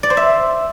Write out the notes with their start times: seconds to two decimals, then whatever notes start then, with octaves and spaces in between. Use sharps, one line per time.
0.03 D5
0.10 C5
0.17 E5